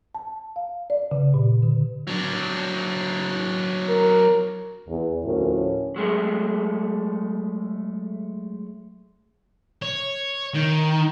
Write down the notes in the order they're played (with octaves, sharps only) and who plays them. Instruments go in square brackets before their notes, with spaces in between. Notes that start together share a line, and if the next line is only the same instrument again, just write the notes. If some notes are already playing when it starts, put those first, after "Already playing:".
[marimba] A5
F5
D5
C#3
A#2
D3
[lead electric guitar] F#3 D4
[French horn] A#4
[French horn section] E2
D2 A2 F3 C#4 F#4 A#4
[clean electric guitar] F#3 G#3 A3
[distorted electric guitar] C#5
D#3